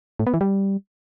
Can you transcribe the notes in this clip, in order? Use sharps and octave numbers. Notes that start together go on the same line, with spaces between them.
A2
B3
E3
G3